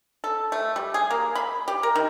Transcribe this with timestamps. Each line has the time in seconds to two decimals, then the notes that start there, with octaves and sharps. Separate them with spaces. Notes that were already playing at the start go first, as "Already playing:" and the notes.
0.24 A4
0.52 A3
0.76 G3
0.94 G#4
1.11 A#3
1.35 B5
1.68 G4
1.83 A#4
1.96 D#3